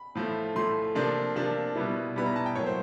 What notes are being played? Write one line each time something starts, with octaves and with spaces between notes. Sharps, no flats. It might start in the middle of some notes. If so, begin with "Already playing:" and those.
Already playing: B5
A2 F3 A3
A2 F3 A3 C6
C3 F3 A#3 D4 F4
C3 F3 A#3 D4 F4
B2 G3 B3 E4
B2 G3 B3 E4 B5
A#5
A5
G5
A2 F#3 A#3 C#5
C5